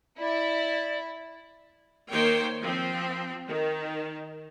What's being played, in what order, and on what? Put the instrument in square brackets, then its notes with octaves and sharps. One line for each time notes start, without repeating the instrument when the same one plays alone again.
[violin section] E4 [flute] D5
[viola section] D#3 A#3 C5 C#5 G5
F3 C4
D#3